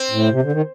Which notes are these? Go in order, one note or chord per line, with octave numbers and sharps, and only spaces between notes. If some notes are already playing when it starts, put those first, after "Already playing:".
Already playing: C4
A2
C3
D3
D#3